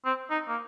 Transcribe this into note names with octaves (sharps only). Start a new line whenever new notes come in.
C4
D#4
A#3